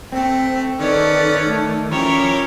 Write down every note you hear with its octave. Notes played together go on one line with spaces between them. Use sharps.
A3 C4 G5
D#3 B3 C#4 A4 D5
A3
F3 C#4 E4 G4 A#4 C#5